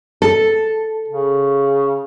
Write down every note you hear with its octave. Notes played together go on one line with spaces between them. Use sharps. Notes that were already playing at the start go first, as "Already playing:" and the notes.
A4
C#3